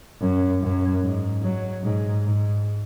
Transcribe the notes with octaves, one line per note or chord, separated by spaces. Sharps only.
F#2
F#2
G#2
F#3
G#2
G#2